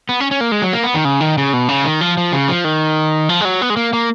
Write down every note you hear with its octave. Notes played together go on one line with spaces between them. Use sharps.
B3
C#4
C#4
A#3
G#3
F#3
A#3
B3
D#3
C#3
D#3
C#3
B2
C#3
D#3
F3
F3
C#3
F3
D#3
F3
G#3
F#3
B3
G#3
A#3
A#3